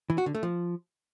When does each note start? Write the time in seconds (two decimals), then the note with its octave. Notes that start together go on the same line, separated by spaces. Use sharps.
0.10 E3
0.18 F#4
0.26 D3
0.35 A3
0.43 F3